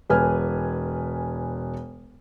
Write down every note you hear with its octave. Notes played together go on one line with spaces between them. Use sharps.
E1 B4 G#5 F6